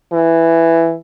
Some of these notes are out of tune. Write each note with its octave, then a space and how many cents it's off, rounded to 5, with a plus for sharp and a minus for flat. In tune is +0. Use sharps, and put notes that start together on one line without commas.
E3 +5